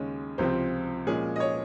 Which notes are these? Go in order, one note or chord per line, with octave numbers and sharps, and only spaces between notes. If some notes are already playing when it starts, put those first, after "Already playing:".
Already playing: D#2 C#3 G#3 C#4
C#2 C3 F3 C4 C5
A#2 F3 G#3 C#4 G#4
D#5
C#5